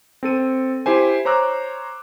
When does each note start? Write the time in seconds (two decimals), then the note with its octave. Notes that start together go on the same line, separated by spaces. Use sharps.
0.23 C4 A4 D#7
0.86 E4 G4 C5 G#5
1.25 C5 C#5 A#5 D6 E6 F#6